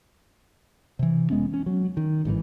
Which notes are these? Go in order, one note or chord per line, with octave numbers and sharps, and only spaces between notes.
C3 E3
F1 G#3 B3 C#4
C#4
F#3
D#3
A1 G#2 B2 E3